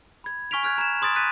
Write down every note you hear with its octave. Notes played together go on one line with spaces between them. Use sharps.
B5 G#6
G#5 C#6 F6 B6 D7 F7
C#6 F6 F#6 G#6
A#5 F6 G#6 E7
B5 C6 D#6 G#6 A6 D7
F#6 A6 B6 D#7